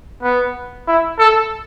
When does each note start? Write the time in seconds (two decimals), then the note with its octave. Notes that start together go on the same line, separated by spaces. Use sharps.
0.23 B3
0.87 E4
1.19 A4